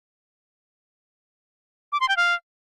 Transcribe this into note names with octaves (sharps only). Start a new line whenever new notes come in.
D6
C6
G5
F5